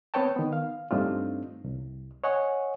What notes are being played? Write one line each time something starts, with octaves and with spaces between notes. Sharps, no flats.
B3 C4 B4 C#5 G5 A5
D#3 B3
F5
G2 A3 C4 D4 D#4 F4
C2
C#5 D#5 F#5 G#5 C#6